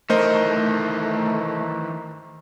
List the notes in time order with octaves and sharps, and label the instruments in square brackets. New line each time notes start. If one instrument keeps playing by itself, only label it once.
[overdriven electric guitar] D#3 E3 [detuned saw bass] A3 [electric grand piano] A#4 C5 D#5